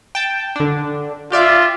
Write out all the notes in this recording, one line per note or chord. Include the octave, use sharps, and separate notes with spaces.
G5 A5
D3 D4
F4 G4 D5 E5